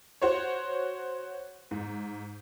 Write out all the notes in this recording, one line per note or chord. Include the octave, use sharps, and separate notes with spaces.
F#4 C5 C#5
G#2